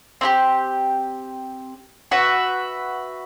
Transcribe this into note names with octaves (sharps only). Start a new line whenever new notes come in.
C4 E4 G4
F#4 B4 E5